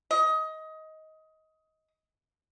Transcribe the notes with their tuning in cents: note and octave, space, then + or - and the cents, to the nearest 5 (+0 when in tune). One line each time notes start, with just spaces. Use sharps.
D#5 +20